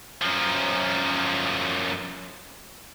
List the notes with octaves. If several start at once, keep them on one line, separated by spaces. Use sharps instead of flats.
F#2 F3